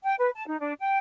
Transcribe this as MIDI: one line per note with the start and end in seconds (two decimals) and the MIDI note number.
0.03 0.14 79
0.19 0.30 71
0.35 0.45 81
0.47 0.59 63
0.60 0.72 62
0.80 0.98 79